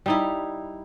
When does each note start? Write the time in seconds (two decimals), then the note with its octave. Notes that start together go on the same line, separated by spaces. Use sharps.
0.06 G3 D#4 E4